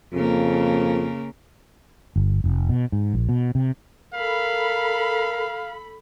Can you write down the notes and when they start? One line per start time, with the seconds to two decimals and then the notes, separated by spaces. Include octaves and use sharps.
0.13 F2 C#3 A#3
2.16 G1
2.44 F1
2.69 B2
2.92 G#2
3.14 A#1
3.29 B2
3.55 C3
4.14 A4 A#4 F5 B5